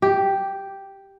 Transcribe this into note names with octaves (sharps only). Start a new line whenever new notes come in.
G4